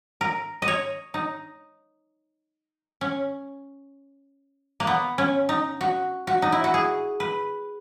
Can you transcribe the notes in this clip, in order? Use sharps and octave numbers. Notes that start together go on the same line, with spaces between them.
A#4
D#5
C#5
D#4
C#4
A#3
B3
C#4
D#4
F#4
F#4
D#4
E4
F#4
G#4
B4